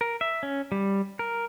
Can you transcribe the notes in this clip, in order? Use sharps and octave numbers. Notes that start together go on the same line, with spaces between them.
A#4
E5
C#4
G3
A#4